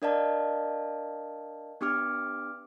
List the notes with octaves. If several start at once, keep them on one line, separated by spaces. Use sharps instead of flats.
D4 A#4 D5 D#5 F5 A5
B3 D4 G4 D6 F6